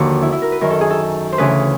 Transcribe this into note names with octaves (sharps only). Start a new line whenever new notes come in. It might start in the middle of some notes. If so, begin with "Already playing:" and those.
Already playing: D#2 D3 F3 F#4
E4
E4
A#4
B4
F#2 D#3 A#4
A4
G#4
A4
C5
D2 C#3 E3 B4